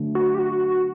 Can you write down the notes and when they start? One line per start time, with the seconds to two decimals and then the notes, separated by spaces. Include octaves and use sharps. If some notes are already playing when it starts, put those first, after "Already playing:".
Already playing: D3 F#3 A3
0.15 F#4
0.35 G4
0.39 F#4